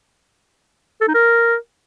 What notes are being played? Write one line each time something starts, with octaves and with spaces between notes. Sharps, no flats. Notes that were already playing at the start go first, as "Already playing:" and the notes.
A4
D#4
A#4